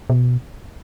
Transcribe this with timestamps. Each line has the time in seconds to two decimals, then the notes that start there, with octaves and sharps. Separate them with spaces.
0.10 B2